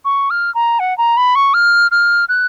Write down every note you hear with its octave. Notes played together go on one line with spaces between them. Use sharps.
C#6
F6
A#5
F#5
A#5
B5
C#6
F6
F6
F#6